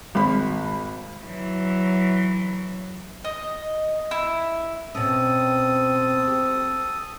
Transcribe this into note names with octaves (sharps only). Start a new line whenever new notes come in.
G#1 B5
E3 F#3
D#5
E4
B2 C4 C#4 A4 D#6
G4